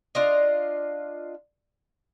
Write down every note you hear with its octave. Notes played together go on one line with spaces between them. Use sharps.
D4 F4 D#5